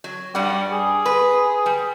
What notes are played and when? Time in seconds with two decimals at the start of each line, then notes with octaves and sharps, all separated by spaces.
0.04 F#3
0.35 G2 G3 F#5
0.72 G#4
1.05 B4
1.66 G3